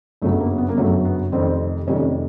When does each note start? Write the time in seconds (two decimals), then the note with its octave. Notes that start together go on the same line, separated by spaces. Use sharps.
0.22 G1 F#2 C#3 F#3 A3
0.40 A#3
0.58 B3
0.69 A#3
0.77 G1 F#2 C#3 F#3 A3
1.05 B3
1.32 F1 F2 C3 D#3 C4
1.87 F1 F2 C3 D#3 C#4